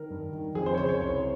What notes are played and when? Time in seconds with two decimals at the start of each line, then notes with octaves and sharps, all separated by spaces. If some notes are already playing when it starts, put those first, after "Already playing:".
Already playing: D#3 A#4
0.10 G2
0.33 D#3
0.55 F2 G#4
0.66 C5
0.74 C#5
0.77 C#3 C5
0.89 C#5
1.00 C2 C#5